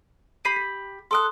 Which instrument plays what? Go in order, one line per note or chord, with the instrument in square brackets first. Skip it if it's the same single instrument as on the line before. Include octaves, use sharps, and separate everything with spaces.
[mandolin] G4 B5 [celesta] B6 C7 D#7
[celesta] B6
[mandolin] A4 D6 F#6 [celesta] C6 D#6